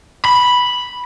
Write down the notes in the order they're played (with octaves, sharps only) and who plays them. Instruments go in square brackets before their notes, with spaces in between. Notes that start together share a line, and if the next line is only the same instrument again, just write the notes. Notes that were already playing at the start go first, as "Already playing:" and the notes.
[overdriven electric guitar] B5